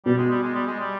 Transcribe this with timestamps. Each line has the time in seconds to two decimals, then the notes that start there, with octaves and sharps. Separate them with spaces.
0.05 B2 G3
0.18 G#3
0.30 G3
0.43 G#3
0.55 G3
0.67 G#3
0.80 G3